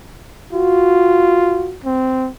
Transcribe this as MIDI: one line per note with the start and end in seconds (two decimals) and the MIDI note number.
0.53 1.71 65
0.53 1.75 66
1.84 2.29 60